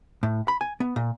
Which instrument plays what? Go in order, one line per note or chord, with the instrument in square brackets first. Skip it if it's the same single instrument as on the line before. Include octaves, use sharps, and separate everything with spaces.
[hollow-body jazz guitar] A2
B5
G#5
B3
A#2